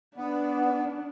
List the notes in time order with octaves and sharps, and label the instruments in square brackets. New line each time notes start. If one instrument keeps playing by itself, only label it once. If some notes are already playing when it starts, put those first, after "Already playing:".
[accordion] B3 [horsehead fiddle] D4